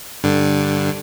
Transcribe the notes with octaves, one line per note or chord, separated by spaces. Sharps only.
G2 D3